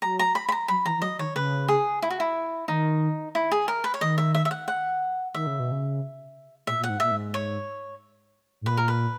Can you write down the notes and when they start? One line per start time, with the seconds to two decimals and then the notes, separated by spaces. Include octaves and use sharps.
0.02 F#3 A#5
0.19 A#5
0.35 B5
0.49 B5
0.52 A#5
0.68 F#3 B5
0.85 E3 A#5
0.98 E3
1.02 F#3 D#5
1.19 D#3 C#5
1.35 C#3 B4
1.68 G#4
2.02 E4
2.10 F#4
2.20 E4
2.68 D#3 D#4
3.35 E4
3.52 G#4
3.68 A#4
3.84 B4
3.94 C#5
4.01 D#3 D#5
4.18 E5
4.35 E5
4.45 E5
4.51 F#5
4.68 F#5
5.34 D#3 E5
5.47 C#3
5.59 B2
5.72 C#3
6.67 A#2 E5
6.79 A#2 F#5
6.89 G#2
7.00 A#2 E5
7.11 G#2
7.34 C#5
8.61 G#2
8.66 A#2 B4
8.77 A#4
8.88 B4